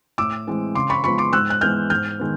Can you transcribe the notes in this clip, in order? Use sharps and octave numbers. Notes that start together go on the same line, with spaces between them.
A2 D6 E6
E3 G#3 C4
C#3 C6 D6
B5 C#6
F3 G#3 B3 B5 C#6
C6 D6
G#2 E6 F#6
F#6
E3 G#3 B3 F6 G6
G#2 F6 G6
D#3 G#3 B3